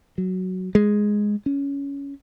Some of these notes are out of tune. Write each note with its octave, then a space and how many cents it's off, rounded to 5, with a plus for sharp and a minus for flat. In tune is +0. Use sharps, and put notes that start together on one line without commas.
F#3 +0
G#3 +0
C#4 +15